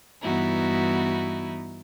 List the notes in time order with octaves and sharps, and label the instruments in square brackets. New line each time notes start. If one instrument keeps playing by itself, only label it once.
[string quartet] G2 E3 B3 D#4 E4 F#4